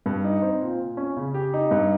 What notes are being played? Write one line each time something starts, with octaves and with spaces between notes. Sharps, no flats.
G2
D#4
C4
A#2
A#2
C#4
C#3
G4
D#4
G2